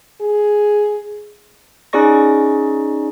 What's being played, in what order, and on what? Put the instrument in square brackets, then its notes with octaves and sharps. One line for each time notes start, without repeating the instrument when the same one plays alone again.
[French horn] G#4
[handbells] C#4 D#4 G#4 D5 C#6 A#6